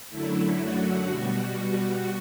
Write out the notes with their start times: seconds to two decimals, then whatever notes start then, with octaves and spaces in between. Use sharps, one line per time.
0.09 F#2 D3 F#3 A3 E4
0.58 F#4
1.06 G3
1.11 B2